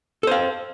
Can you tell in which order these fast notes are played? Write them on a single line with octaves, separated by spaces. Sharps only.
A4 C5 F5